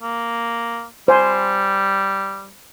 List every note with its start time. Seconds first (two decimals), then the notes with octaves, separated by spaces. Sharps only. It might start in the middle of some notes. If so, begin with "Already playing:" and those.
0.02 A#3
1.08 G3 C5 G#5